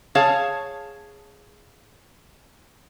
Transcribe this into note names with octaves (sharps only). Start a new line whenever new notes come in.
G#4 C#5 F5 A5